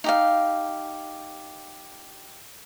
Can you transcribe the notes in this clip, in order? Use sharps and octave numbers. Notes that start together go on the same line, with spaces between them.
D#4 G4 F5